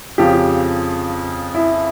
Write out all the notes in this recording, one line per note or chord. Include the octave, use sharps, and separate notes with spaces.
F2 C#3 F3 G4
E4